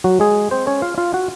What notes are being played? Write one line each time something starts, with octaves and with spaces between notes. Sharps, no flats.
F#3 F#4
G#3 G#4
C4 C5
C#4 C#5
F4 F5
F4 F5
F#4 F#5